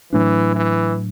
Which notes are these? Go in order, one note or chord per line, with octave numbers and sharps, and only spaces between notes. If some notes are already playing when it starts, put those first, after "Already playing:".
A2 E3 F#3 A3 D4
E3